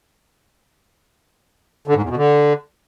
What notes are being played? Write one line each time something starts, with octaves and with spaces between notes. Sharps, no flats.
D3
G#2
E2
B2
D3